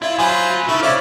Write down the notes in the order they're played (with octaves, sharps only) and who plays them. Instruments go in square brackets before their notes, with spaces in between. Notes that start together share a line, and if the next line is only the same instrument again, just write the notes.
[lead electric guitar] E4 [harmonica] F4 [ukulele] D5
[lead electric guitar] F#2 B4 [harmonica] F#3 F4 C5 [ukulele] G#5
[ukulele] F#4
[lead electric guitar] C#3 [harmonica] A3 E5 [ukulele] D#4 E4 B4
[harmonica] C#4 E4 D5 [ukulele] C5 E5 F5